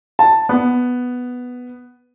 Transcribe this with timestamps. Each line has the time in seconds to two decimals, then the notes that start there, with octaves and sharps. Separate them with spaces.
0.19 A5
0.49 B3